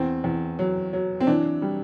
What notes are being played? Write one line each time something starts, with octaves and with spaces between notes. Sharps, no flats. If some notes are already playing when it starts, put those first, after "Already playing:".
Already playing: E2 C4
E2
F#3
F#3
C4
E3 D4
G3